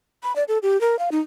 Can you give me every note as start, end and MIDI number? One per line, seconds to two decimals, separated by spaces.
0.23 0.35 83
0.36 0.44 74
0.48 0.58 69
0.63 0.80 67
0.81 0.99 70
0.99 1.09 77
1.12 1.19 63